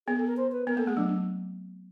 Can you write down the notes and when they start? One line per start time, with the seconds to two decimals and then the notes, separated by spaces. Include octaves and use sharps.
0.07 B3 G#4
0.17 A4
0.27 A#4
0.37 C5
0.52 B4
0.67 B3 A#4
0.77 A#3 A4
0.87 A3 G#4
0.97 F#3 D4